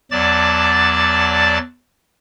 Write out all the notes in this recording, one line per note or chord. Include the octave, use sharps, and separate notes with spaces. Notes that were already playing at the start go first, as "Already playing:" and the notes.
E2 F#3 D5 A5 D6 A6